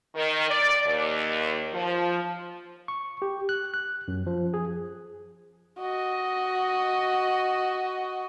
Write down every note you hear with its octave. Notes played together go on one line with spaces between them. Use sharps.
D#3
D5
D#2
F3
C#6
G4
F#6
F#6
F#2
F3
G#4
F#4 D#5